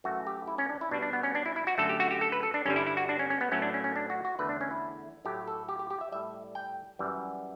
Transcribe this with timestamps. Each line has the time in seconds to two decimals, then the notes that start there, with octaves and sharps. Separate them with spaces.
0.04 F#2 E3 A3 F#4
0.27 G4
0.47 E4
0.58 C#4
0.70 D4
0.81 E4
0.91 B2 G3 D4
1.02 D4
1.13 B3
1.23 C#4
1.35 D4
1.46 E4
1.56 E4
1.67 F#4
1.78 F#2 D3 A3 A4
1.89 G4
2.00 F#4
2.11 G4
2.21 A4
2.32 B4
2.43 A4
2.54 D4
2.66 G2 D3 G3 C#4
2.76 E4
2.87 E4
2.97 F#4
3.09 D4
3.19 C#4
3.30 C#4
3.41 B3
3.52 A2 F#3 A3 C#4
3.62 D4
3.74 C#4
3.84 C#4
3.96 D4
4.10 F#4
4.25 F#4
4.39 E2 D3 A3 B4
4.49 D4
4.61 C#4
4.71 E4
5.25 A2 F#3 A3 G4
5.48 A4
5.69 G4
5.79 G4
5.90 G4
6.01 E5
6.12 A2 G3 E5
6.55 G5
6.99 F#2 E3 G3